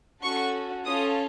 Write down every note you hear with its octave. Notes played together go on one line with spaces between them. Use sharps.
C#4 F#4 A4 C#6
C#4 F4 A4 D#6